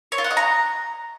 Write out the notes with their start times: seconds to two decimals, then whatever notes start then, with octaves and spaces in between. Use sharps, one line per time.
0.12 C#5
0.18 F4
0.24 F#5
0.31 D#5
0.37 A#5